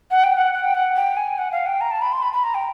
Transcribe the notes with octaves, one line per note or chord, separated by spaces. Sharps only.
F#5
G5
F#5
F#5
G5
F#5
G5
G#5
F#5
F5
G5
A#5
A5
B5
C6
B5
B5
A#5
G5